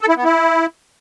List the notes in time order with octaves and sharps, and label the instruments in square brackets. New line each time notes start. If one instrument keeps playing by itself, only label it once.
[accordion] A4
E4
B3
E4